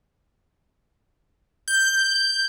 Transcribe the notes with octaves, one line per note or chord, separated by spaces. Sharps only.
G6